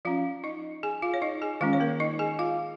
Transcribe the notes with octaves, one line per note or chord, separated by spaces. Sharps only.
F3 C#4 F4 F5
D#4 D#5
G#4 G#5
F4 F5
C#5
D#4 D#5
G#4 G#5
D#3 G#3 C#4 F4 F5
C#5
A#3 A#4
D#4 D#5
G#4 G#5
F4 F5